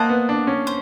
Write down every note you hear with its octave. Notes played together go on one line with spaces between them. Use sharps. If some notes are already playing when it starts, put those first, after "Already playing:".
Already playing: A#3 C5 D#5 F#5 A5
B3
D4
C#4
C5